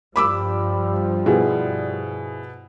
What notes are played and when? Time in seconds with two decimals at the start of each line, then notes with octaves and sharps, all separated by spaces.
0.16 G2 F3 G3 B5 D6 E6
1.26 B2 E4 G#4